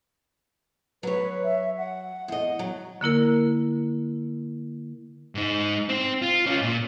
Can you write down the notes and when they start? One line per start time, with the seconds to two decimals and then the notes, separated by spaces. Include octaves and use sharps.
1.03 F#3 B4 C#5
1.44 E5
1.78 F#5
2.28 E2 D#5
2.59 F#3
3.01 D3 A#3 E4 A#4
5.35 G#2 D#4
5.89 C4 C5
6.22 F4
6.46 C#4 F4
6.62 A#2